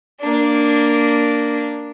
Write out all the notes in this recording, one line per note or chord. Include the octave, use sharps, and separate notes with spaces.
A#3 D4